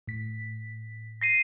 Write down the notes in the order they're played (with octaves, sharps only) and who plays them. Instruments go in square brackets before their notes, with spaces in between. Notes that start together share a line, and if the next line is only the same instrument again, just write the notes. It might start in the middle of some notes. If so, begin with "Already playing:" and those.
[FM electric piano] A2 B6
[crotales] A#6 C7 D#7